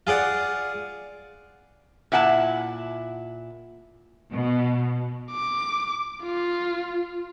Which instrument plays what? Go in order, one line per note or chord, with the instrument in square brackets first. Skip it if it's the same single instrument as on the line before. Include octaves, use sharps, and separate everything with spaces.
[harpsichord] F4 G#4 D5 F#5
[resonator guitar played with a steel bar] A#2 E4 F#5 G#5 A5
[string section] B2
[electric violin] D6
F4